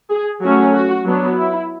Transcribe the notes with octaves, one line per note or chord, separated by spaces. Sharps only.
G#4
F#3 A3 C#4 F#4
F#4
F#3 B3 D4
E4